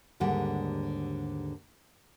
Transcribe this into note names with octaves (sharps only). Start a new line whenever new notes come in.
D#2 G#2 D3 G3 F#5